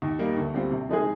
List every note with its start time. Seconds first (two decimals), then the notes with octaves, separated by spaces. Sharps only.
0.02 D#2
0.19 D#3 G3 A#3
0.37 D2
0.54 D3 G3 C4 F4
0.71 C3
0.89 F3 G#3 D#4 G#4